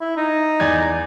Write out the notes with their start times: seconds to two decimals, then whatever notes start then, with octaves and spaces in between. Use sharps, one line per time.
0.01 E4
0.17 D#4
0.60 E2 D5 G#6